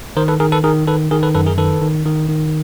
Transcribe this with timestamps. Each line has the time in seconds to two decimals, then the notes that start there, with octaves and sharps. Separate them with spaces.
0.17 D#3 A#4 C5
0.28 A4 B4
0.40 D#3 G#4 A#4
0.52 A4 B4
0.64 D#3 G#4 A#4
0.87 D#3 A4 B4
1.11 D#3 G#4 A#4
1.23 A4 B4
1.35 F#2 A4 B4
1.46 G#4 A#4
1.58 D#3 A4 B4
1.81 D#3
2.06 D#3
2.29 D#3